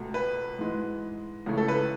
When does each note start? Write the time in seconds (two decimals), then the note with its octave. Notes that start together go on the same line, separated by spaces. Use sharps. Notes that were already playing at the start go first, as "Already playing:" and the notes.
Already playing: C#2 B2 A3
0.14 B4
0.59 G#2 E3 G#3
1.46 C#2 C#3 E3 A3
1.57 A4
1.68 B4